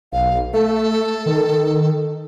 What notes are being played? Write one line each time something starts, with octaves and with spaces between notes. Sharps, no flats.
B1 F5
A3 A4
D#3